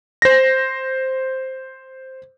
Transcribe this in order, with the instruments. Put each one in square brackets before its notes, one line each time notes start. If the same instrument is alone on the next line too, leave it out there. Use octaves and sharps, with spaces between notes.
[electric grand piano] C5 A#6